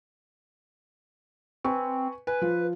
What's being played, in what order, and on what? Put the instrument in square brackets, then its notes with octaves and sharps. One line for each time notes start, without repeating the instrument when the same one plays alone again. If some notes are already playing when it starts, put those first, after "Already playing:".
[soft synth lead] C4 [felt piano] B4 G#5 C#6
[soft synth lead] B4 [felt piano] G#5
[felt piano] F3 F4